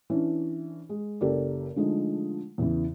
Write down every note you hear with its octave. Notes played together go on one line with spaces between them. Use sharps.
E3 C#4 D4
G#3
F#1 G4 A4 A#4 D5
D3 F3 G#3 A3 D#4
E2 C#3 E3